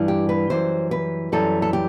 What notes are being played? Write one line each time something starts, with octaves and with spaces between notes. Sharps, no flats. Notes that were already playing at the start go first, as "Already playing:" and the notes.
Already playing: G2 E3 G3
G4
B4
F#2 E3 G3 C5
B4
F#2 E3 G3 A4
A4
G4